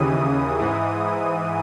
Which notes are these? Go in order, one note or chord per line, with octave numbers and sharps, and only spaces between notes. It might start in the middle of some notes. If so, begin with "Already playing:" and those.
Already playing: D#2 C#3 E3 D#6
G#2 E3